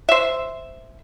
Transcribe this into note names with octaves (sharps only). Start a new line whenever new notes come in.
C5 E5